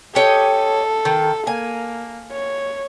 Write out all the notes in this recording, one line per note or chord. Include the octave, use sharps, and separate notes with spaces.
G4 A4 C#5 D#5
D#3
A#3 G#5
C#5